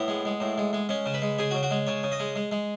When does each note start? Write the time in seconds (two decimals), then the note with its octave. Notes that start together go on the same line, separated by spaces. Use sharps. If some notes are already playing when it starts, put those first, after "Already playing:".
Already playing: A2 B3
0.08 G#3
0.25 G#3
0.40 A2
0.58 G#3
0.73 G#3
0.89 G#3 C#4
1.06 C#3
1.14 B4
1.22 G#3
1.39 C#3 G#4
1.51 F#4
1.55 C#3
1.63 F#4
1.71 G#3
1.87 C#3 C#5
2.03 C#3
2.12 D#5
2.20 G#3
2.36 G#3
2.52 G#3